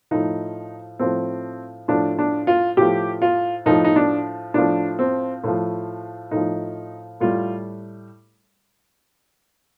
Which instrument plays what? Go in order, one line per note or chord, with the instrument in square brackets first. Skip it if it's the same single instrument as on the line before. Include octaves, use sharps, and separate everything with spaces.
[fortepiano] A2 F3 D#4
A2 F3 C4
A2 F3 D4
D4
F4
A2 F3 G4
F4
A2 F3 D#4
D#4
D4
A2 F3 D4
C4
A2 F3
A2 F3 D#4
A2 G3 F4